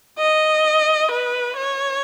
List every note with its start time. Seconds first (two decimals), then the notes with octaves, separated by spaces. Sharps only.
0.19 D#5
1.11 B4
1.56 C#5